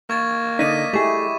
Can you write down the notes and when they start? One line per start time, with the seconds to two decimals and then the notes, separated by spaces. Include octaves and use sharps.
0.10 A#3 C#6 G#6 A6
0.59 D3 D#4 D5 D#5 B6 D#7
0.93 A3 E4 G4 G#4 C#6